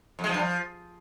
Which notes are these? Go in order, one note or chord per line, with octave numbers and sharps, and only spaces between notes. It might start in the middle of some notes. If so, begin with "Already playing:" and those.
F2
G#3
F3
G2
F3